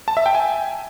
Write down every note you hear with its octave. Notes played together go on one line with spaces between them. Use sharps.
A5
E5
G5
G#5